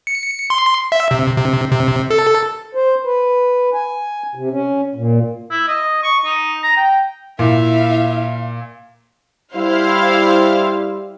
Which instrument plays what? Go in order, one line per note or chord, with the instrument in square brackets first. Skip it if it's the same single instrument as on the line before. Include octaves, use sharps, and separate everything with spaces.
[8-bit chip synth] C#7
C6
E5
C3
C3
C3
A4
[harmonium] C5
B4
G#5
C3
C#4
A#2
[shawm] E4
D#5
C#6
D#4
A#5
G5
[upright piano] A#2 [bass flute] E4 [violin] E5 F5
[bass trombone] G3 [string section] E4 C5 F5